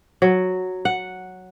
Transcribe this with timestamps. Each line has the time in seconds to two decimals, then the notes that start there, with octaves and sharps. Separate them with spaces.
0.22 F#3
0.85 F#5